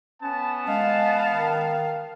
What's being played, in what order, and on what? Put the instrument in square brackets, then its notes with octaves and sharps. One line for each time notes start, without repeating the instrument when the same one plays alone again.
[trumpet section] B3 A5 [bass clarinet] C#4
[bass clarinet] G#3 [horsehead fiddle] F5
[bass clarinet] D#3